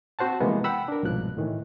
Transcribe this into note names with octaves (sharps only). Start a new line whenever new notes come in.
C4 F#4 C5 F#5 A5
C3 E3 F3 G#3 A#3 B3
F#5 G5 B5 E6
D4 A#4
C2 G#2 B2 F3 F#6
A2 D#3 E3